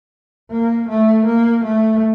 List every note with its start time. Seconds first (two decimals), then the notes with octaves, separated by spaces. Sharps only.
0.51 A#3
0.89 A3
1.26 A#3
1.65 A3